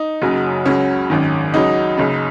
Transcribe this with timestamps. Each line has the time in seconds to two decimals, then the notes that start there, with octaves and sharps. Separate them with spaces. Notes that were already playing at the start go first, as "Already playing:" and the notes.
Already playing: D#4
0.22 F#1 F#2 C#3 F#3
0.66 C#2 C#3 F#3 C#4
1.10 G#1 F#2 D#3
1.54 C#2 C#3 F#3 D#4
1.98 F#1 F#2 C#3